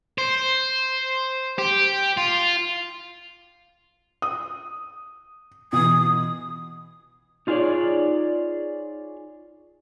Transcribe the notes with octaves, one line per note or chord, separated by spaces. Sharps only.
C5
G4
F4
D#6
B2 E3 D#6
D#4 F4 G#4 A4 C#5 D5